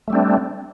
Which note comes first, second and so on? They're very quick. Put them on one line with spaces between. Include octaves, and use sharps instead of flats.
A3 G3 C4 D4